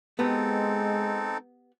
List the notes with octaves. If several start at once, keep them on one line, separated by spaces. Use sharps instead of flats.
G#3 B3 C4 D#4 G4 A4 B4